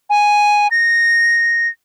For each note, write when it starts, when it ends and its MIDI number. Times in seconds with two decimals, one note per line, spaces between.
0.10 0.67 80
0.71 1.68 94